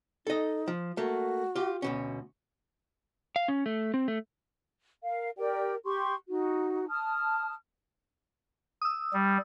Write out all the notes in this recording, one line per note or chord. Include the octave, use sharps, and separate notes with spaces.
D#4 A4 D#5
F3
A3 A#3 F#4
F4 G4
D2 B2 C#4
F5
C#4
A3
C4
A3
A#4 F5
G4 A#4 D5 G5
G4 C6 C#6
D#4 F#4
A5 D#6 F6
D#6 E6
G3